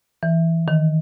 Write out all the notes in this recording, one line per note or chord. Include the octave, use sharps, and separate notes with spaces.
E3
D#3